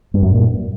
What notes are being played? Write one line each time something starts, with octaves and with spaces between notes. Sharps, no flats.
G2
F#2
A#2